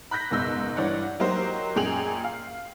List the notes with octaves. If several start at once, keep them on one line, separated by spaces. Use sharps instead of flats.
B5 F#6 G6 A#6 B6
F#1 G#2 B2 E6 G6
G2 E3 C#5 D5 F#5
F#3 A#3 D#4 G4 A#4 C5
F#2 A#2 G#4 G5 F7 F#7
F5